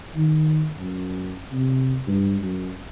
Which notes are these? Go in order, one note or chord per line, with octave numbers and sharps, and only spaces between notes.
D#3
F#2
C3
G2
F#2